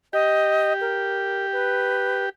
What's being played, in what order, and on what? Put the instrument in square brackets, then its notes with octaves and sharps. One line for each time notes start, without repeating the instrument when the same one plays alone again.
[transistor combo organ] G4 [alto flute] D#5
[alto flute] A#4
B4